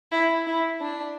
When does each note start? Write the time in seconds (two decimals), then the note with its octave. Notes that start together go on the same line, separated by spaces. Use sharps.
0.12 E4
0.47 E4
0.81 D4